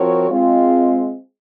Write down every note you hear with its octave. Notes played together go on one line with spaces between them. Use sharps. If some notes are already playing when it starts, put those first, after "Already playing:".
Already playing: F3 C4 F#4 A#4 C#5
G#3 C4 F4